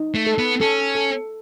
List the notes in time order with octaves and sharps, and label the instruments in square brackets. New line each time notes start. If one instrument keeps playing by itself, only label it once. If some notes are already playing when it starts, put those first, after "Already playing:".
Already playing: [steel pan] D#4
[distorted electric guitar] A3
[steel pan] A4
[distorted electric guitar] B3
[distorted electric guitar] C#4 [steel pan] A4
[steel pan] A4